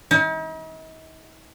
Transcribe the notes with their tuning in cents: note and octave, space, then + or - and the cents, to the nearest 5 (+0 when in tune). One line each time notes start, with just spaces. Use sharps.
D#4 +45